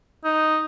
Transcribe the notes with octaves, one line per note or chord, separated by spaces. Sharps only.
D#4